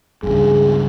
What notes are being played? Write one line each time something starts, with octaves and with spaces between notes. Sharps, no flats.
C#2 G2 G#4